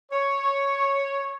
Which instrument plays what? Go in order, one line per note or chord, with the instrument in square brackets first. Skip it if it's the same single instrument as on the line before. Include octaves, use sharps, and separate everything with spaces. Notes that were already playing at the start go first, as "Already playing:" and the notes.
[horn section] C#5